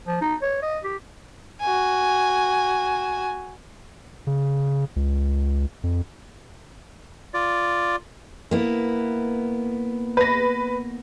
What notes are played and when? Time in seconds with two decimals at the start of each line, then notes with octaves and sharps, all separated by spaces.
0.07 F3
0.21 D#4
0.42 C#5
0.62 D#5
0.84 G4
1.61 F#4 G#5
4.27 C#3
4.96 C#2
5.83 F2
7.34 F4 D5
8.51 A#3 B3 E4
10.17 B4 A#6